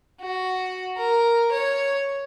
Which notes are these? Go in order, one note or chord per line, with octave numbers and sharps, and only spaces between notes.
F#4
A#4
C#5